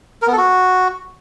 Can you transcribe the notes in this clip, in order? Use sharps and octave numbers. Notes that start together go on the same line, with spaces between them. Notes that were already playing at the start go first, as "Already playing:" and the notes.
A#4
B3
A4
F#4